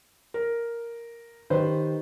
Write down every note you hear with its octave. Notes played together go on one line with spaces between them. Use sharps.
A#4
D#3 G4 B4 C5